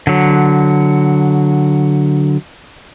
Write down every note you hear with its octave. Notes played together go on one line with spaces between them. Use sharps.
D3 F#3